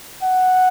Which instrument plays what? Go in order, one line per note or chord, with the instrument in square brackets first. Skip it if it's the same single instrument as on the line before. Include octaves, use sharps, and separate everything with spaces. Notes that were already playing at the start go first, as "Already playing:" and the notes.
[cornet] F#5